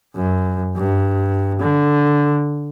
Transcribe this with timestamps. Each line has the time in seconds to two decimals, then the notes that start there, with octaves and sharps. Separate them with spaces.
0.16 F#2
0.76 G2
1.60 D3